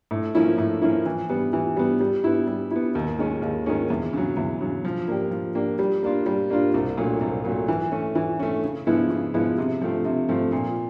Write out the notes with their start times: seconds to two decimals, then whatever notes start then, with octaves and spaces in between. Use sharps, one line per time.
0.11 A2
0.35 F3 A#3 C#4 E4
0.58 A2
0.82 F3 A#3 C#4 E4
1.06 E3
1.30 G3 B3
1.53 E3
1.77 G3 B3
2.01 G3
2.24 B3 E4
2.47 G3
2.71 B3 E4
2.95 D#2
3.18 D#3 G#3 C#4
3.42 D#2
3.66 D#3 G#3 C#4
3.90 E2
4.13 C#3 F#3
4.37 E2
4.61 C#3 F#3
4.85 F3
5.08 A#3 D4 G4
5.31 F3
5.55 A#3 D4 G4
5.79 G3
6.03 A#3 D4 F4
6.26 G3
6.50 A#3 D4 F4
6.74 C2
6.97 A#2 F#3 A3
7.21 C2
7.44 A#2 F#3 A3
7.68 E3
7.92 A3 C#4
8.15 E3
8.40 A3 C#4
8.63 C#3
8.87 F3 G#3 B3 E4
9.10 C#3
9.34 F3 G#3 B3 E4
9.58 C3
9.81 F3 A3 C4
10.05 C3
10.29 F3 A3 C4
10.52 A#2